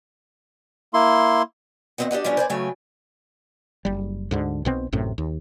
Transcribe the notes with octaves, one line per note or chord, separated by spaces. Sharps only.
A#3 E4 C6
E2 G2 C4 D#5 F#5
D4 G4 D#5 F#5
F3 G3 B3 C#4 D4
C5 D5 G#5
C#3 F#3 A3 G5 G#5
F#1 G3
D2 G#2 D3
B1 B2 C4
A1 F#2 A2 C3
D#2